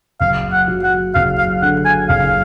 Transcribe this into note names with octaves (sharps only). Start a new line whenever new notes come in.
F#1 F5
F#5
F#3
F#5
F#1 F5
F5
D3 F#5
G#5
F#1 F5